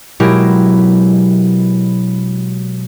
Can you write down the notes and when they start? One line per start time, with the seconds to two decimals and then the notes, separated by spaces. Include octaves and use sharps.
0.20 B2 F#3 G#3 E4 G4 A#4